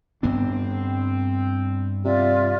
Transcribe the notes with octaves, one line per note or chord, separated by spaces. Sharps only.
G2 B3 C4 D4
C3 F4 D5 E5